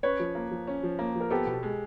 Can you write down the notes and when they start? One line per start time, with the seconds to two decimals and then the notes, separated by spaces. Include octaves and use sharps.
0.03 C#4 B4 C#5
0.20 F3
0.35 A#3
0.51 F3
0.67 C#4
0.83 F3
0.99 A#3
1.15 F3
1.21 A#4
1.30 B3 G4 A4
1.47 B2
1.63 G#3